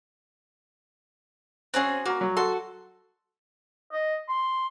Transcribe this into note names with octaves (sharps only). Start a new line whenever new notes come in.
C4 C#4 F#4 G#4 F#6
A#3 F#4 A#5
F#3
F#4 A4 C6
D#5
C6